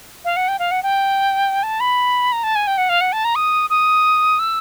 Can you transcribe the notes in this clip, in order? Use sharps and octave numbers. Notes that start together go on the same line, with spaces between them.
F5
F#5
G5
F5
F#5
G5
A5
B5
A#5
A5
G#5
G5
F#5
F5
F#5
A5
A#5
D#6
D#6
E6